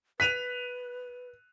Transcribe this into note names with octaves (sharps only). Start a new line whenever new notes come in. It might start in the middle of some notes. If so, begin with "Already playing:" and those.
B4 F#6 B6 D#7 F7